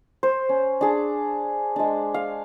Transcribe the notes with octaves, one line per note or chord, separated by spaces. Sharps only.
C5
C#4
D4 G#4
G#3 D4
F5